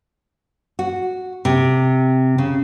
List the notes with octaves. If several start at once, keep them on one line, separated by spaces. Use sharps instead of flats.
F#4
C3
C#3